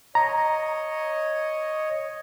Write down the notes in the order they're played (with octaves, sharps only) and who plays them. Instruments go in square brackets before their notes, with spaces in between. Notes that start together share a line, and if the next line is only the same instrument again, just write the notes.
[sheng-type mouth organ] C#5 D#5 [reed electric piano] A#5